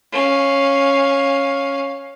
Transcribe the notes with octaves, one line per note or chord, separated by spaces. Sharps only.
C#4 F5